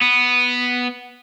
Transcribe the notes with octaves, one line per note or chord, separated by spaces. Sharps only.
B3